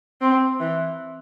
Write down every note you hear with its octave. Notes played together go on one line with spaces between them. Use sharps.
C4
E3